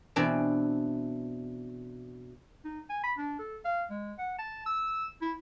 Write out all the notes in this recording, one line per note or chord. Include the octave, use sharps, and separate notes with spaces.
B2 E3 C4 D4
D#4
G#5
B5
D4
A4
F5
G#3
F#5
A5
E6
E4